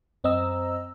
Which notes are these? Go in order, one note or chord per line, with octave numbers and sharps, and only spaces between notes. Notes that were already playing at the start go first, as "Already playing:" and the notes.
F#2 C4 D#5 A#5 E6